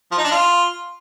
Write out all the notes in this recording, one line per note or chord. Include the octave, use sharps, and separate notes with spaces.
F3
D#4
D4
F4